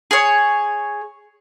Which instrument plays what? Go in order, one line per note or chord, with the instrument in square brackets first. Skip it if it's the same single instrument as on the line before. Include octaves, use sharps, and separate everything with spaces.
[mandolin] G#4 C#5